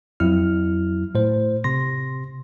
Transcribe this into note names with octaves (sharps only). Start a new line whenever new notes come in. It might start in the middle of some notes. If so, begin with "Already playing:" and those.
F2 F#3 E4 F6
A2 C5
C3 C6 A#6